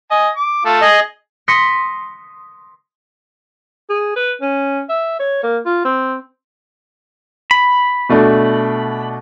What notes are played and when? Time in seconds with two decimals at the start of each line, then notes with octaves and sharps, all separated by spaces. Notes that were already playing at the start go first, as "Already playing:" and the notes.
0.11 D#5 G#5
0.36 D6
0.65 A3 F4
0.82 G#4 D#5
1.48 C6 D#6 A#6 B6 C#7
3.90 G#4
4.16 B4
4.42 C#4
4.89 E5
5.20 C#5
5.43 A#3
5.66 F4
5.85 C4
7.51 B5
8.09 B2 A3 D4